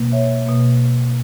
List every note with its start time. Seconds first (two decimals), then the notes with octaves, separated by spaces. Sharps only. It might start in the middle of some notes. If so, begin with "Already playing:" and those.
Already playing: B2 A#3
0.12 C#5 E5
0.46 B2 A#3